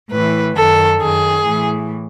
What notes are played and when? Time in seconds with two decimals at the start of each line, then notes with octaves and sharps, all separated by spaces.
0.10 A2 E3 B4
0.55 F#2 D#3 A4
1.00 F#2 D#3 G#4
1.45 A2 E3